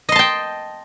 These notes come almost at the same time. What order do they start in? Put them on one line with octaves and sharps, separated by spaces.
D#5 C6 A5 G5